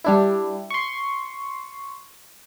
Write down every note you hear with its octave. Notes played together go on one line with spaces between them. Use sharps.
G3 D4 E4
C6 C#6